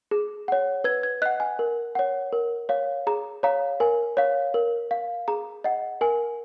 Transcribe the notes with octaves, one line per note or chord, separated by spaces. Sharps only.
G#4
C#5 F#5
B4 G#6
G#6
D#5 F#5 F#6
G#5
A#4
C#5 F#5
A#4
C#5 F5
G#4 A#5
C#5 F5 A#5
A#4 G#5
C#5 F5
A#4
F5
G#4 A#5
D#5 F#5
A#4 G#5